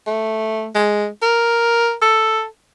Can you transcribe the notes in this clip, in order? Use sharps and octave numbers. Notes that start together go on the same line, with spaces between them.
A3
G#3
A#4
A4